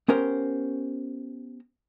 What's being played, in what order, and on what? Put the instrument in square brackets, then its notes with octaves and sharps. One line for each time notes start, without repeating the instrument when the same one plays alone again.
[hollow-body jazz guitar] B3 C#4 G4 A#4 C5